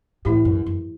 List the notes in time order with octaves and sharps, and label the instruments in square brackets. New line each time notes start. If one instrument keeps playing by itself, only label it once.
[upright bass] A2 [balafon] E3 A3 E4 G4
[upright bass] F#2
F#2